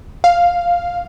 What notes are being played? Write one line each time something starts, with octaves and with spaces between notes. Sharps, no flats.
F5